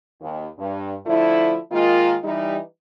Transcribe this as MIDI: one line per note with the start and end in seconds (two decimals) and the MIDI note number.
0.21 0.47 39
0.59 0.94 43
1.06 1.57 50
1.06 1.57 53
1.06 1.57 57
1.06 1.57 64
1.72 2.14 51
1.72 2.14 56
1.72 2.14 58
1.72 2.14 65
2.24 2.57 52
2.24 2.57 55
2.24 2.57 63